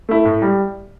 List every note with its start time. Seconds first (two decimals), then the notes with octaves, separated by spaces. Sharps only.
0.09 A3 E4
0.25 A2
0.42 G3